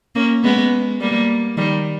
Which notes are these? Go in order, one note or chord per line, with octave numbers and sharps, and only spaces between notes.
A#3 C#4
G#3 B3
G3 A#3
D#3 G3